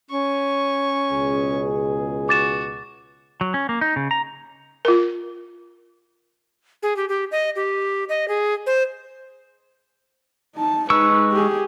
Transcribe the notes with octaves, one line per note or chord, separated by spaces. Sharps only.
C#4 C#6
C#2 B2 G#4
F#4 D6 A6 E7
F#3
C#4
A#3
D#4
C#3
A#5
F4 A#4
G#4
G4
G4
D#5
G4
D#5
G#4
C5
D#4 A5
G#3 D#4 B4 C#6 E6
G4 G#4